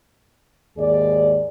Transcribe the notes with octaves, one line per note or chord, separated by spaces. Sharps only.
D#2 G#2 G#4 D5